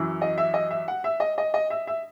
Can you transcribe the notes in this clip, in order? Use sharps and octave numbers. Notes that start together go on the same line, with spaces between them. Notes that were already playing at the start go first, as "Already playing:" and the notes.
Already playing: F#2 E3
D#5
E5
D#5
E5
F#5
E5
D#5
D#5
D#5
E5
E5